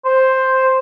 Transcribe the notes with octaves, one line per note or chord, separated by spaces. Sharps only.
C5